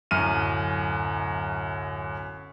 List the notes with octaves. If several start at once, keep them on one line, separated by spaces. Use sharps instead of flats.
D1 F#2 F6 D#7